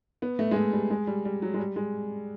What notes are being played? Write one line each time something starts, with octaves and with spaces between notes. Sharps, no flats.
B3
A3
G#3
A3
G3
G#3
G3
G3
F#3
G#3
G3
G#3